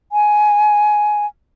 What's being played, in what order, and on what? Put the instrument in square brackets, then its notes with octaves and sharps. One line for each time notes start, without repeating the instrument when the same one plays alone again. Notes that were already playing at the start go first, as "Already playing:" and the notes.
[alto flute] G#5